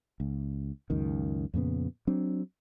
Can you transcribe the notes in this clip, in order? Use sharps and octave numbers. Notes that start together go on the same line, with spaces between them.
C#2
C#2 F#2 D#3
F2 A#2 C#3 B3
F#3 C4 D4